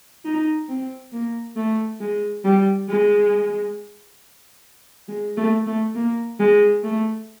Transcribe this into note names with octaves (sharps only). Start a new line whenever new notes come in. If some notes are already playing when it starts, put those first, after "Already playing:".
D#4
C4
A#3
A3
G#3
G3
G#3
G#3
A3
A3
A#3
G#3
A3